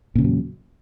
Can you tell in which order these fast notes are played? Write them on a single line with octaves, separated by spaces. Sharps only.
A#2 C#3 E2 F#3